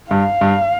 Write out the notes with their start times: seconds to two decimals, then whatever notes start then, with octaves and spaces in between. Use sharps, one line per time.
0.10 G2 F5
0.41 G2